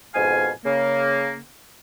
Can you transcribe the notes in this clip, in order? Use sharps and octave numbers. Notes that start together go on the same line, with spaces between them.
F2 G#2 B2 F5 G#5
C#3 A#3